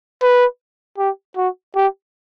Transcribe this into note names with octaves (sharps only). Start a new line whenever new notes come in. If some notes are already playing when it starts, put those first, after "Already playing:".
B4
G4
F#4
G4